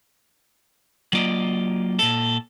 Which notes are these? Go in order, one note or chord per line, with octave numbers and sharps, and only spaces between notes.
F#3 A#3 F4 D5 D#5
A#2 A4